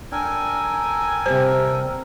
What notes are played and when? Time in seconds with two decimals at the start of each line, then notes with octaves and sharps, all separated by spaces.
0.12 D4 A4 A#4 G5 G#5
1.26 C3 G3 C5